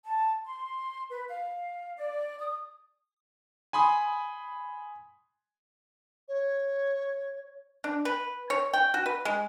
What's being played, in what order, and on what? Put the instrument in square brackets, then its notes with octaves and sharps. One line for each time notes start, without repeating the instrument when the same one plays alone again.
[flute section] A5
C6
B4
F5
D5
D#6
[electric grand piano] G#5 B5 C6 D#6
[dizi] C#5
[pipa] D4
B4
C#5
G5
F#4
B4
G#3